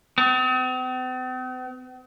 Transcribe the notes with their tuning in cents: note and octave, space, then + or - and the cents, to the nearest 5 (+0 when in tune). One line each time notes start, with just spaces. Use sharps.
C4 -45